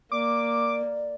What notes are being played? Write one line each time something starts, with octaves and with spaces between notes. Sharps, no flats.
A#3 D5 D6